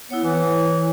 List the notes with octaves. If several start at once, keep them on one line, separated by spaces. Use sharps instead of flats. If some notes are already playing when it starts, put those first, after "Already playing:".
B3 E4 C#5
E3